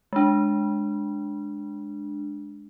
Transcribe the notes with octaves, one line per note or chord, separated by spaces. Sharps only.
G#3 D4